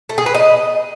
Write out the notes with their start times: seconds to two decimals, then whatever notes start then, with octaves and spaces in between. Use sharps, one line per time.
0.09 A3
0.18 G#4
0.26 B4
0.35 D#5